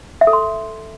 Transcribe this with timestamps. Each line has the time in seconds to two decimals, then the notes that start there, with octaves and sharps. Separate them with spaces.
0.21 E5
0.27 A4
0.33 C6